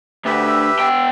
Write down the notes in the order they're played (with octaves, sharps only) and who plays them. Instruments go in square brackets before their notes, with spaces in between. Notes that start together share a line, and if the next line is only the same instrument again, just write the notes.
[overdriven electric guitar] D2 [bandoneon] G4 B4 E5
[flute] E6
[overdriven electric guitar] B3 G5